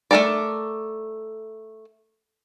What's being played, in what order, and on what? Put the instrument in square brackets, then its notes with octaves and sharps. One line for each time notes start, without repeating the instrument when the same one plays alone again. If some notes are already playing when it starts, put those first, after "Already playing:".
[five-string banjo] A3 E4 A4 A#4 D5